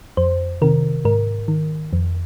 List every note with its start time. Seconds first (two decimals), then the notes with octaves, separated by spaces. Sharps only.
0.17 F2 C5
0.62 C3 D#3 A#4
1.05 G#2 A#4
1.48 D#3
1.93 F2